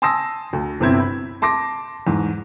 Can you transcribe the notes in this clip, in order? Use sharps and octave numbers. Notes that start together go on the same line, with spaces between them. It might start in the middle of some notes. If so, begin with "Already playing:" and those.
G#5 A5 C6 D#6 E6 A#6
D2
G1 C3 B3 C4 E4 G#6
B5
A5 C6 D6 A#6
E2 G#2